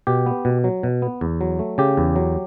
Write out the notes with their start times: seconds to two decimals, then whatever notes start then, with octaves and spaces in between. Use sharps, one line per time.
0.07 B2 G4
0.26 B3
0.45 B2
0.64 F#3
0.83 B2
1.02 B3
1.21 E2
1.41 F#3
1.59 A3
1.78 C#3 G4
1.97 E2
2.16 F#3